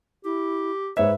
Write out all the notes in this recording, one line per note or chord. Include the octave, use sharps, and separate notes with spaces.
E4 G4
G#2 B4 C#5 E5